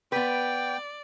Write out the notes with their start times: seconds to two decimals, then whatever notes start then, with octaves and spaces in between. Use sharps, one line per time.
0.12 B3 B4 D5 G5